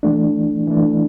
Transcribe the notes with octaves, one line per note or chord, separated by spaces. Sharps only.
E3 A3 D4
E3 A3 D4